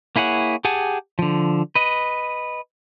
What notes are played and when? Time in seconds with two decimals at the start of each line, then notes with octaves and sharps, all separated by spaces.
0.16 A#3 E4 G#4 C#5 F#5
0.65 G4 G#4 F#5 G#5 A5
1.19 D3 F3
1.75 B4 D#5